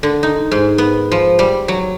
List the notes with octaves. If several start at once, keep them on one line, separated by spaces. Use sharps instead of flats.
D3
D#4
G#2
B3
F3
G3
F#3